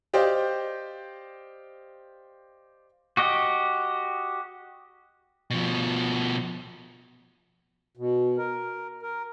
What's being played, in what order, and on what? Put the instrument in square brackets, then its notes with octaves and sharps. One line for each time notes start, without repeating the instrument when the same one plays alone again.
[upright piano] G4 C5 D5 D#5 F5 G5
[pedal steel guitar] F#4 G4 D#5
[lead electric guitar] B2 F3
[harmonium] B2
A#4
A#4